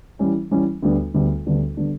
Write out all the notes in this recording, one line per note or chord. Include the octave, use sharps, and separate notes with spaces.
E3 G3 C#4
E3 G3 C#4
D2 D3 G3 B3 D4
D2 D3 G3 B3 D4
D2 D3 G3 B3 D4
D3 G3 B3 D4